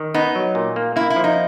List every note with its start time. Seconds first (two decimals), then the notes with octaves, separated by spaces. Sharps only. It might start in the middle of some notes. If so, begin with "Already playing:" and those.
Already playing: D#3
0.14 B3 D#4
0.35 F#3
0.55 A#2
0.76 A#3
0.96 A#3 E4
1.10 E4
1.16 F3
1.24 D#4